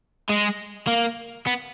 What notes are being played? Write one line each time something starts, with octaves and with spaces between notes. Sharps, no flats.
G#3
A#3
B3